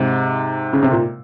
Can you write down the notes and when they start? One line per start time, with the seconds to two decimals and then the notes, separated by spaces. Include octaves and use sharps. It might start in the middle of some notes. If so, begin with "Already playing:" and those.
Already playing: G#2 C3
0.73 C#3
0.83 C3
0.92 A#2